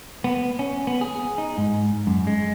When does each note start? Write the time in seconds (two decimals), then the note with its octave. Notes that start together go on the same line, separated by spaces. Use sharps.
0.24 B3
0.59 C#4
0.87 B3
1.01 G#4
1.38 D#4
1.58 G#2
2.07 F#2
2.27 G#3